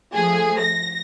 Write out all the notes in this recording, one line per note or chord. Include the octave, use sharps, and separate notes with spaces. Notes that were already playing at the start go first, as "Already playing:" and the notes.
F3 A3 G#4
A#6